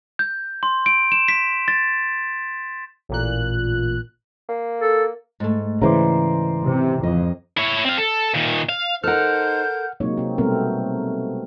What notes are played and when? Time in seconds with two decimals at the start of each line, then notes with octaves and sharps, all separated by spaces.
0.19 G6
0.63 C6
0.86 D7
1.12 E7
1.28 B6
1.68 A6
3.09 A1 A#2 F#6
4.49 A#3
4.80 A4
5.40 G#2 A3
5.82 C#3 E3 A#4 C5 D5
6.66 C3
7.03 F2 D#5
7.57 E4 C#5
7.85 C4 F5
7.98 A4
8.34 A#2 D#3
8.69 F5
9.04 D#4 A4 A#4 C5 F#5 F6 G6
10.00 C3 F#3 G#3 A#3 D#4 C#5
10.17 C3 C4
10.38 B2 G3 A3 B3 C4 A#4